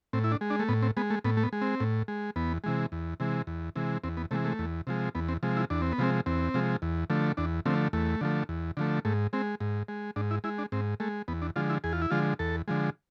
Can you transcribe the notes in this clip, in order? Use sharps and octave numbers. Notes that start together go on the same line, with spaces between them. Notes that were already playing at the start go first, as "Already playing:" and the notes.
A2 C4
E4
D4
G#3
D4
A3
A2 B3
C4
G#3 B3
A3
A2 B3
A3
B3
G#3
C4
A2
G#3
E2 B3
C3 E3 G#3
E2
C3 E3 G#3
E2
C3 E3 G#3
E2 C4
B3
C3 E3 G#3 A3
A3
E2
C3 F3 G#3
E2 B3
C4
C3 F3 G#3
E4
E2 D4
C4
B3
C3 F3 G#3 C4
E2 C4
C3 F3 G#3
E2
D3 F3 A3
E2 D4
D3 F3 A3 C4
E2 A3
D3 F3 A3
E2
D3 F3 A3
G#2 A3
G#3 C4
G#2
G#3
G#2 D4
E4
G#3 E4
D4
G#2 C4
G#3 A3
E2 B3
D4
D3 F3 G#3 F4
E4
E2 G#4
F4
E4
D3 F3 G#3 F4
E2 A4
D3 F3 G#3